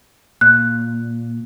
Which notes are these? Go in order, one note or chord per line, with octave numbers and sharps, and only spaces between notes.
A#2 F#6